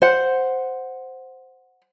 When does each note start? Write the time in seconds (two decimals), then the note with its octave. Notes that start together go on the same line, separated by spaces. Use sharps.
0.02 C5 F#5